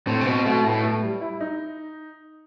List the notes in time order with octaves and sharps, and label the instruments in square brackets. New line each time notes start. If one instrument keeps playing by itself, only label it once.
[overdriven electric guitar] A2 [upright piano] C4
[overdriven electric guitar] C3
[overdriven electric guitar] B2 [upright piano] C4
[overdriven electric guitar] B2 [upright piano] A3
[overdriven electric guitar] A2 [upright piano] B3
[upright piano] A3
G3
E4
D#4